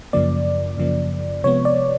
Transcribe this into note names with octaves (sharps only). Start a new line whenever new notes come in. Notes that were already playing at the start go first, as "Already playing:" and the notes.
F#2 C#3 F3 A#3 D5
F#2 C#3 F3 A#3
C3 F3 G#3 B3 C#5
D5